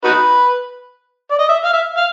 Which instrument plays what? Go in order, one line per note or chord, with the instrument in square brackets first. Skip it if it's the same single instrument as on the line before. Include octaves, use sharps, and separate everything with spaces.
[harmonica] D#4 F#4 B4
D5
D#5
E5
F5
E5
F5